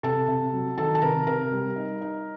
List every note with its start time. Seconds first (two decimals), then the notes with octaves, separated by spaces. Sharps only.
0.03 C3 A4 A5
0.28 C3
0.54 F#3
0.78 D#3 A4 A5
0.95 A5
1.02 C3 A#4 A#5
1.27 C3 A#4 A#5
1.52 G3
1.76 D#4
2.01 D#4